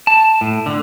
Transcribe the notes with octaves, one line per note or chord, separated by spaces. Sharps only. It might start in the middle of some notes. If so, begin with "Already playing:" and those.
A5
A2
D3